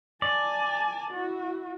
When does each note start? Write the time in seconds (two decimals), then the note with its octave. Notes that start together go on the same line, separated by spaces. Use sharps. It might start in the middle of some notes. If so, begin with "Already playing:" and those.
0.22 D5 G#5 A5
1.11 E4 F#4